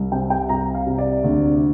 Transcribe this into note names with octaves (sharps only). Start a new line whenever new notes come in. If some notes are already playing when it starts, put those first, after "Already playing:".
Already playing: C2
C3 G5
G5
C2 A#5
F5
C3
D5
D2